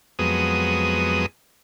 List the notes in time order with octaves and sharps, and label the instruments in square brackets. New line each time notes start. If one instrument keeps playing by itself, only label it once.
[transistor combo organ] F2 F#3 G#3 B3 D#6